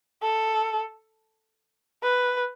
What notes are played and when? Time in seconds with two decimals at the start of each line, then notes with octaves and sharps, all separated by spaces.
0.23 A4
2.03 B4